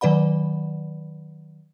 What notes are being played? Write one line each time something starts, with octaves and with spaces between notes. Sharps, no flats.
D#3 F#3 B4 D5 F#5 B5